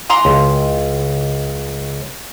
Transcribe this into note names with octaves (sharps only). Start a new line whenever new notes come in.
E3 A#5 C6
C#2